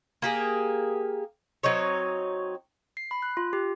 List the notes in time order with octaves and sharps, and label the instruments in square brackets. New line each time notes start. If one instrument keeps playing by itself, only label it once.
[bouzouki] A#3 G4 G#4
F#3 C4 D#4 C#5
[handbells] C7
B5
F#6
F4
G4